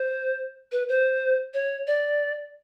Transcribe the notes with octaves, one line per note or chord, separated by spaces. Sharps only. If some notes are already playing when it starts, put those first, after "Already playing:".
Already playing: C5
B4
C5
C#5
D5